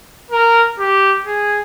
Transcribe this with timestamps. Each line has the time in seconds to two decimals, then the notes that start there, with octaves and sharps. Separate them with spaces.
0.31 A#4
0.79 G4
1.26 G#4